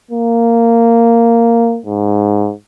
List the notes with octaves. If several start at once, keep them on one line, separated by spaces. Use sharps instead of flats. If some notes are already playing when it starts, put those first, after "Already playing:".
A#3
G#2